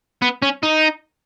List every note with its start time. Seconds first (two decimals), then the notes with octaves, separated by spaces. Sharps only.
0.22 B3
0.42 C#4
0.63 D#4